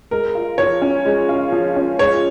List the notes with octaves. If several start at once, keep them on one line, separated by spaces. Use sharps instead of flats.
G#3 A#4
F4
F3 C#5
C#4
G#3
F4
F3
C#4
G#3 C#5